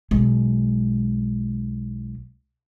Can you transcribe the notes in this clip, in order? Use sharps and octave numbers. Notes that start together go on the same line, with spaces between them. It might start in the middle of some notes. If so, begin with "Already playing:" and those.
B1 G#3